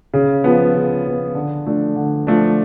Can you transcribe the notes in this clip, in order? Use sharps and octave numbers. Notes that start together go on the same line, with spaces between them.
C#3
F3 B3
C#3
F3 B3
D3
F3 A3 D4
D3
F3 A3 D4